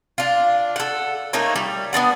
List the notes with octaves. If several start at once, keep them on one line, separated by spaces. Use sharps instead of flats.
D4 F4
A4 F#5
A3 A#3 D#4 C#5
G3
B3 C4 D4 F#5